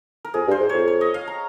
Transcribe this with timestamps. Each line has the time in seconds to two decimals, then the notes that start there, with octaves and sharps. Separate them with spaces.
0.25 A#4
0.34 F2 G#4
0.47 G2
0.51 C5
0.60 G#2
0.69 F2 C#5
0.88 C#5
1.01 D#5
1.14 F5
1.28 A#5